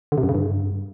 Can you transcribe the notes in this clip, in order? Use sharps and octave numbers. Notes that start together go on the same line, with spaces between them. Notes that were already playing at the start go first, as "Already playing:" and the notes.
D3
C3
F#2
C#3
G2